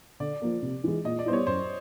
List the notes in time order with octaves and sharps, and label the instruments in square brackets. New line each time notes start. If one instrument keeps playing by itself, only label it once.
[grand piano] D3 [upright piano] D5
[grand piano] F3 A#3
C3
E3 G#3
[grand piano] A#2 [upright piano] D#5
[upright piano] D5
[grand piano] B3 E4 [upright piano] C5
[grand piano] G3 [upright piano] C#5
[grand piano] F#2 [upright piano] C5